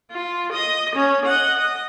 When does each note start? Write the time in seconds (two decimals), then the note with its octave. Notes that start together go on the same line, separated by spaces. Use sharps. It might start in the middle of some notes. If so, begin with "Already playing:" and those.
0.11 F4
0.52 D#5
0.95 C#4
1.25 D#5 F#5
1.58 D#5